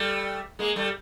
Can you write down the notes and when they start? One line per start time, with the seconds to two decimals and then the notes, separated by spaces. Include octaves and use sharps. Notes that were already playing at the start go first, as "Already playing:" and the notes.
Already playing: G3 A3
0.59 G#3 A#3
0.76 G3 A3